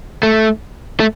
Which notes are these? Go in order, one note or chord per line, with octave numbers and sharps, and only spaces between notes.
A3
A3